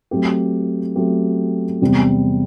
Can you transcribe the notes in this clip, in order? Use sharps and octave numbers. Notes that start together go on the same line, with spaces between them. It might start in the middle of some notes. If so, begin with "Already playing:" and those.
F#3 A3 C4 G4
F#3 A3 C4 G4
E2 C3 G3 C4